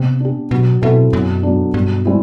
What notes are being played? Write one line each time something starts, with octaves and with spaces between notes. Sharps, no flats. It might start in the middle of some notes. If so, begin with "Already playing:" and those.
Already playing: C3 B3
D4 G4
B2 F#3
B2 C4 E4 A4 E5
F#2 B2
F#3 B3 D4
G2 B2
G3 C4 E4